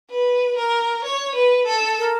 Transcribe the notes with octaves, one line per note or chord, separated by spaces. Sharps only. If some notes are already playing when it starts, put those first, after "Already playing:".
B4
A#4
C#5
B4
A4
A#4